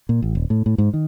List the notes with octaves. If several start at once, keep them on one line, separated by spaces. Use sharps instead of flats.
A#2
A1
D#1
A2
A2
G#2
D#3